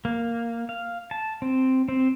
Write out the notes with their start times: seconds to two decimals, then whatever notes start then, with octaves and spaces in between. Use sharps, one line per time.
0.05 A#3
0.69 F5
1.11 A5
1.42 C4
1.88 C4